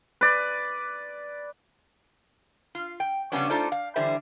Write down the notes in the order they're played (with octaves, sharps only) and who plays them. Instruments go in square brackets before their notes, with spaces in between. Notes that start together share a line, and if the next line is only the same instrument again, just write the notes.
[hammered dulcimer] B4 D5
[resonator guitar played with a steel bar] F4
G5
C#3 F3 G3 B3 C#4 D4
A3 D#4 F4 A4 C5 D5
F5
D3 E3 G3 C5 E5